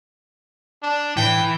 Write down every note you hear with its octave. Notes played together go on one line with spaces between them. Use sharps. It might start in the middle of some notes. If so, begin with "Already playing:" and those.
D4
A2 E3 G5